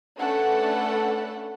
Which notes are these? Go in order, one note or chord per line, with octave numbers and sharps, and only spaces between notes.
A3 C#4 D4 A4 B4 F#5